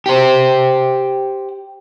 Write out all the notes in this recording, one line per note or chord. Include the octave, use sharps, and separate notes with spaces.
G4 C5